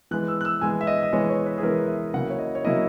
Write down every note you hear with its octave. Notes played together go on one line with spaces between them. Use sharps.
E3 G#3 B3 F#6
E6
F#6
E6
E3 G#3 B3 G#5
E5
D#5
D#5
E3 G#3 B3 C#5
C#5
B4
G#4
E3 G#3 B3 A#4
E5
C#3 F#3 A#3 E4 F#5
C#5
D#5
C#5
C#3 F#3 A#3 E4 D#5